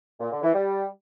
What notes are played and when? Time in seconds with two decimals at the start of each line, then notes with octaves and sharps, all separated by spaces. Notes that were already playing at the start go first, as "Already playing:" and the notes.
0.20 A#2
0.31 D3
0.42 E3
0.53 G3